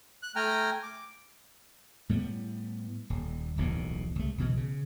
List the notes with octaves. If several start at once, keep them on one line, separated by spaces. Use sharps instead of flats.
F#6
A3 G5 G#5 A#5 F6
D6
A2 G3 A3 B3
D#1
D1 B1 A#2 E3
C2 A3
B1 B2 E3
C#3